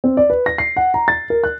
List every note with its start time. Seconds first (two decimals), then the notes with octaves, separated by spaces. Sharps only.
0.04 C4
0.17 D5
0.30 B4
0.46 A#6
0.58 C7
0.76 F#5
0.94 A#5
1.08 A6
1.30 A#4
1.44 F#6